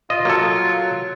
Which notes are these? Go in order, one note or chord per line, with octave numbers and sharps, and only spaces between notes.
F4 D#5
F#3 A#3 A4